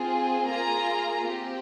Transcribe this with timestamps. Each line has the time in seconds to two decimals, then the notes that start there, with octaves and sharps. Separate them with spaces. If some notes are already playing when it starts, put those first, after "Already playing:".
Already playing: C4 F4 G#4
0.47 A#3 F4 G#4 A#5
1.26 C4 G4